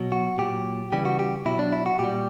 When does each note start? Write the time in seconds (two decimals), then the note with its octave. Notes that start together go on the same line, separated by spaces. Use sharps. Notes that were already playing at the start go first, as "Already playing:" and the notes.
Already playing: B2 F#3
0.12 F#4
0.38 A#2 F#3 G4
0.92 C#3 E3 G3 G4
1.05 F#4
1.19 G4
1.46 B2 F#3 E4
1.59 D4
1.72 E4
1.86 F#4
1.99 A#2 G3 G4